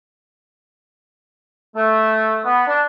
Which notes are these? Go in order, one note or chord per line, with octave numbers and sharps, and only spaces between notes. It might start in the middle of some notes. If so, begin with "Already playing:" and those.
A3
B3
D4